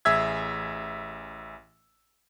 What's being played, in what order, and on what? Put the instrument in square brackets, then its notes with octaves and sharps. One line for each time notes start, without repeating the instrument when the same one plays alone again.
[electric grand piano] A1 G#4 E5 E6 G#6